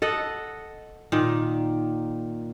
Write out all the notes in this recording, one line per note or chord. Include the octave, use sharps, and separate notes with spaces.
A4 D#5 F#5
A#2 D#3